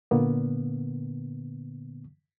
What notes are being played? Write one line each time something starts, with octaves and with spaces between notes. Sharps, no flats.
A#2 D3 A#3 B3